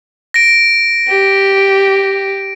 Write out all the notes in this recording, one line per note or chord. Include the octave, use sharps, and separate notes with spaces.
A#6 D7
G4